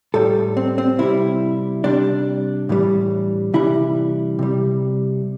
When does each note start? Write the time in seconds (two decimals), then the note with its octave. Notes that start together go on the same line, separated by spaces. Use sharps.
0.14 A2 G3 A4
0.57 C4
0.78 C4
0.99 C3 G3 E4
1.84 C3 G3 D4
2.69 A2 E3 G3
3.54 C3 E3 G3 E4
4.39 C3 G3